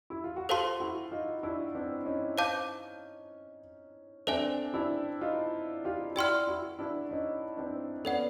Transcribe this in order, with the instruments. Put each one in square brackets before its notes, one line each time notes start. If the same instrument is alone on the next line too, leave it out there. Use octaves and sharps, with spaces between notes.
[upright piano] E4
F4
F#4
[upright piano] F4 G4 [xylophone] A4 C5 F5 A5 C6
[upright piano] E4 F#4
D#4 F4
D4 E4
C4 D4
C#4 D#4
[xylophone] C5 F5 A5 D6 G6
[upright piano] C4 D4 [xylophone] A4 C5 E5 G#5
[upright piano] D4 E4
D#4 F4
F4 G4
[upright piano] E4 F#4 [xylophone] D5 G5 C6 F6
[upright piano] E4 F#4
D4 E4
C#4 D#4
C4 D4
[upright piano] B3 C#4 [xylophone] A4 D5 F#5